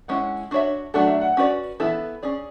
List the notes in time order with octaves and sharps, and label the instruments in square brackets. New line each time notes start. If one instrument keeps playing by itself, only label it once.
[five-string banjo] G#3 C#4 E4 [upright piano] F#5
[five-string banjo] D4 F#4 C#5 E5
[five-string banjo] F#3 A3 D4 F#4 A4 [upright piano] F#5
[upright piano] E5
F#5
[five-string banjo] C#4 F#4 B4 D5
[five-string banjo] E3 B3 E4 A4 [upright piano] E5
[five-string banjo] C#4 G#4 D5